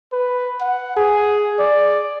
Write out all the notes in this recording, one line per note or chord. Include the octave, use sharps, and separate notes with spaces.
B4
F#5
G#4
D5